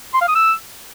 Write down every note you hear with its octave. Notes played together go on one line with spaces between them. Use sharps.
C6
F5
D#6
E6